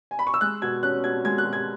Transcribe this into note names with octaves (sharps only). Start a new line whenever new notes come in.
G#5
B5
C#6
E6
G#3 F#6
B2 G#6
C#4 F#6
B2 G#6
G#3 G#6
F#6
B2
G#6